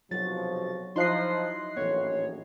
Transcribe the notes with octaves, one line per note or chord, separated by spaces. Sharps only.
B1 C3 F3 F#3 F#4 A6
F3 D#4 E4 D#5 C6 F#6 C7
A#1 F#2 A2 E3 B3 C#5